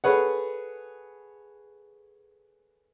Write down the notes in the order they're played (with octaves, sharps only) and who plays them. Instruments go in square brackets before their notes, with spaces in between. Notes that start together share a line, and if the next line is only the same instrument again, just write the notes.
[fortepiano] G#4 A4 B4 C#5 F#5